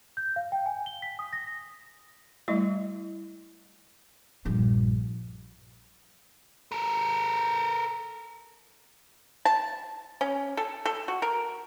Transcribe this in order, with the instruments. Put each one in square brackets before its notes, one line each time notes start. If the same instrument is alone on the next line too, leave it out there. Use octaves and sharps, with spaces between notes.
[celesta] G6
F5
G5
G#5
G7
B6
D#6
A#6
[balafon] G3 A3 E4 D#5
[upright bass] A#1 G2
[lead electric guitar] A4 A#4
[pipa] A5
C#4
A4
A4
F#4
A#4